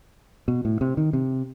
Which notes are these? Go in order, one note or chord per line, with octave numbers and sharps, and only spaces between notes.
B2
A2
C3
D#3
C3